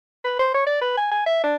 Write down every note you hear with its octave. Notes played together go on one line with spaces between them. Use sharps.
B4
C5
C#5
D5
B4
G#5
G#5
E5
D4